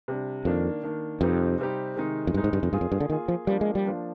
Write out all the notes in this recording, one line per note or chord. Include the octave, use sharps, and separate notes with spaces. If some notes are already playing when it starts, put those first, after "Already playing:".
C3 G3 D4
F2 D#3 A#3 D4
D#3 A#3 D4
F2 C3 G3 C4 D#4 G4
C3 G3 C4 D#4 G4
C3 D#3 G#3 D#4
F2
G2 C3 D#3 G#3 D#4
G#2
G2
F2
G2 A#3 F4 G#4
F2
G2
D3
D#3 A#3 F4 G#4
F3
F3 G3 A#3 D4
G#3
G3
F3 A#3 D4